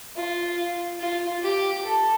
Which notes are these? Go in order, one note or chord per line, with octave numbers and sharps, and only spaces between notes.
F4
F4
G4
A4